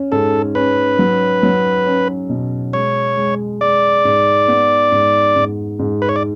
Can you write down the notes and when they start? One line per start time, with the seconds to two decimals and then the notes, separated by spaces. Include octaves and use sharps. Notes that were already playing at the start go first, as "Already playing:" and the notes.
Already playing: C#4
0.12 G#2 A4
0.55 C#4 B4
0.99 F#3
1.43 F#3
1.86 C#4
2.29 B2
2.73 G#3 C#5
3.17 G#3
3.61 G#3 D5
4.05 G#2
4.48 B3
4.92 G#2
5.36 G#2
5.79 G#2
6.02 B4
6.09 C#5
6.16 D5